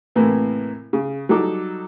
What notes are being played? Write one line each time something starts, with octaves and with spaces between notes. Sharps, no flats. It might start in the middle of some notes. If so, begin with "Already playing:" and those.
A2 C3 E3 A#3
C#3
F#3 G3 D#4 A4 D6